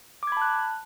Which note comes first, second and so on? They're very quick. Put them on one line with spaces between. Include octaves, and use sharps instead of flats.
D6 G#6 B5 A5 F#6